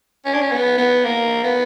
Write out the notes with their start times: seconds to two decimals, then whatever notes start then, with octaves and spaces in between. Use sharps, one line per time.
0.25 C#4
0.34 D4
0.41 C#4
0.51 B3
0.78 B3
1.04 A#3
1.44 B3